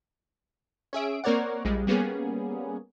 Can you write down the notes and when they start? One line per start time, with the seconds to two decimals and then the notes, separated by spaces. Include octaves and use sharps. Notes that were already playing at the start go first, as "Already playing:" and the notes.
0.93 C#4 G#4 E5 D7
1.24 A#3 C4 A#4 C#5 D5 F#5
1.65 A#1 G3 G#3
1.87 G3 A#3 B3 C#4 G#4